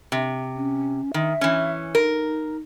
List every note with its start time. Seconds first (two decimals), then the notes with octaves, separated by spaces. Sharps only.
0.12 C3
0.56 C#4
1.14 D#3 E5
1.41 E3 C#4
1.95 D#4 A#4